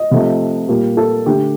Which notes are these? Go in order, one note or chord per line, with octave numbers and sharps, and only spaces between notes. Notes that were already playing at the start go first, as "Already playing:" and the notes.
Already playing: D#5
C3 F3 A3
A#2 G3 A#3
A4
D3 A3 G4